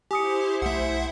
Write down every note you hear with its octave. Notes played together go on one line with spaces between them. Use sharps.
E4 G4 C5 G#5 D#6 C#7
B1 A3 E5 F#5